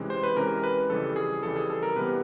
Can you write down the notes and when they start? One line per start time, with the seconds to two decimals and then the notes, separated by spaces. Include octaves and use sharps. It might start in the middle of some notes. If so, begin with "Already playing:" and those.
Already playing: C3 E3 G#3 C#4
0.10 C5
0.23 B4
0.36 C3 E3 G#3 C#4 A#4
0.63 B4
0.89 F2 C#3 E3 G3 A4
1.16 G#4
1.43 F2 C#3 E3 G3 A4
1.56 G#4
1.70 A4
1.83 A#4
1.96 C3 E3 G3 B3 B4